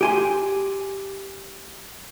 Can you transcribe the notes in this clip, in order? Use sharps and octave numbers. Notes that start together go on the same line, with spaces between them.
G4 G#5 C6